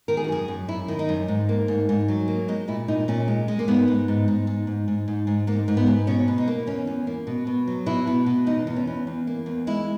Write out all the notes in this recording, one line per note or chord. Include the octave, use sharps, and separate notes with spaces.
D#3 A#4
G#4
F#4
F#2 G#4
F#2
F#2 E4
D#3
D#4
F#2
G#2
A#3
G#2
G#2
F#3
A#3
G#3 D#4
A#2 E4
A#2 D#4
A#2 C#4
G#3
G#3
A#3
G#2 B3
G#2
G#2
G#2
G#2
G#2
G#2
G#2
G#2
G#2 A#3
G#2
B3
G#2
B2 C#4
B2
D#4
A#3
E2 C#4
E2
A#3
B2
B2
F#3
B2 E4
B2
B2
E2 D#4
E2
C#4
E2
E2
A#3
E2
G#3 E4